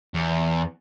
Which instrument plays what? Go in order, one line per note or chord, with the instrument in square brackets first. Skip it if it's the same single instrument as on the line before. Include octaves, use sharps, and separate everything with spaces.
[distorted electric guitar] E2